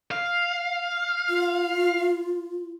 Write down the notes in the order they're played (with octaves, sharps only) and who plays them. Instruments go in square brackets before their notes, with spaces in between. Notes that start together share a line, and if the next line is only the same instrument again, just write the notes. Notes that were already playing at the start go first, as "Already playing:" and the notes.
[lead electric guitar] F5
[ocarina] F4